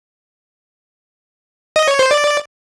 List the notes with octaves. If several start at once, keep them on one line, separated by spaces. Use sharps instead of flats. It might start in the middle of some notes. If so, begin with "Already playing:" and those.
D#5
C#5
C5
D5